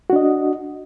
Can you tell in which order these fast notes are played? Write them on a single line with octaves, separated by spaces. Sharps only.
F#4 D4 D#5